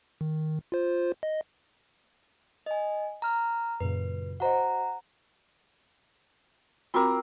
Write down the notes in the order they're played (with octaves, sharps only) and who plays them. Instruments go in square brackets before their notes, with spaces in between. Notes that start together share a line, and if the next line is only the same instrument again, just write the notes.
[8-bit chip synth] D#3
F4 C5
D#5
[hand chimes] D#5 G#5
A#5 F6
[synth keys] F#2 A#2 C#3 [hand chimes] B4
[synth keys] F#4 C5 D#5 [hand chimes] F#5 A#5
[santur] C4 A#4 [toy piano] F4 F#4 D6